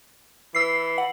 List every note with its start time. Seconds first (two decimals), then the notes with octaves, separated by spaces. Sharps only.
0.55 E3 E6 C7
0.98 F#5